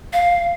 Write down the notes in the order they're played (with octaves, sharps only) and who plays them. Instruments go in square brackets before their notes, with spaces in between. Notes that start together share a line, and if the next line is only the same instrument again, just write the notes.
[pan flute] F5